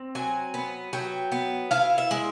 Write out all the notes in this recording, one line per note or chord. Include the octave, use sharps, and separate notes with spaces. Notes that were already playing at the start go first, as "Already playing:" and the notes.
Already playing: C4
F#3 G#5
B3
F#3 G5
B3
E4 F5
E5
G#3